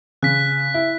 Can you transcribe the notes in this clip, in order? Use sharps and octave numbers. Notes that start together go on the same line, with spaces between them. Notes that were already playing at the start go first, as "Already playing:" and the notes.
C#3 F#6 B6
E4